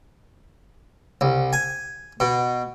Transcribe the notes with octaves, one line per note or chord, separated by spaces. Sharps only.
C2
G#5
B2